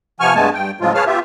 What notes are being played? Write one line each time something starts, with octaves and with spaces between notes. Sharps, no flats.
C3 F3 B3 G#5 C#6 F6
G2 G#3 A3 B3 G#5 A5
G2 G5
A2 C#3 F3 F#3 G#3 F4
G#4 B4 C#5 F5 A5 F6
B3 F4 G4 E5